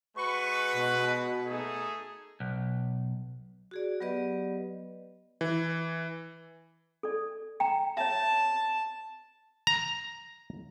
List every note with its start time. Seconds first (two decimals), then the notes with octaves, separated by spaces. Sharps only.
0.17 G#3 F#4 B4 C#6
0.75 B2
1.46 A3 D#4 G#4
2.40 B1
3.71 F#4 G#4 D5
4.00 F#3 B3 G4 B4 D5 D#5
5.41 E3
7.03 A4 D5
7.60 G5 A#5
7.97 C#5 E5 A5
9.67 A#5